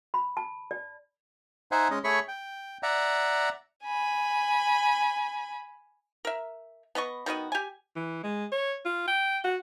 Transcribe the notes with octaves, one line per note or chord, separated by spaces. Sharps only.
B5
A5
D5
D#4 C5 E5 F#5 G#5
G#3 C#4 D#5
A3 G#4 C#5 B5 C#6
G5
D5 E5 F#5 A#5
G#5 B5
A#4 E5
B3 B4 D#5 C#6
D#3 B3 F#4 D#5
G4 G#5
E3
G#3
C#5
F4
G5
F#4